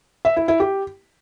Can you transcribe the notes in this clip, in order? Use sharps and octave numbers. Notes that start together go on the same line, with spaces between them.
E5
E4
E4
G4